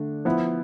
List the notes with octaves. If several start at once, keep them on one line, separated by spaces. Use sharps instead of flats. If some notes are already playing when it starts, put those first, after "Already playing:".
Already playing: D3 A3 D4
F3 B3 E4